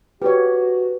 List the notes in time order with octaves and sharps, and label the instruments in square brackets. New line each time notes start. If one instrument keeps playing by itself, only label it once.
[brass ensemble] F#4 [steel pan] G4 C#5 [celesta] B4